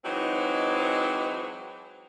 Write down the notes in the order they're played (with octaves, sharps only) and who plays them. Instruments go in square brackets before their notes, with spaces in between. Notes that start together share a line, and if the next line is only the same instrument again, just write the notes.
[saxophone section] E3 F#3 G#3 C4 D#4 C5